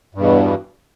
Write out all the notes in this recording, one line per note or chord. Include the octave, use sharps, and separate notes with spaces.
E2 G2 B2